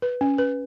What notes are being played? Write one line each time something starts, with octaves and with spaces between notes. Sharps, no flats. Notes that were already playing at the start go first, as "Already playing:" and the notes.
B4
C#4
B4